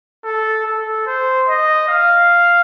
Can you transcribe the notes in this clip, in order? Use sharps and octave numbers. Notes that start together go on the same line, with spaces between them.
A4
A4
C5
D#5
F5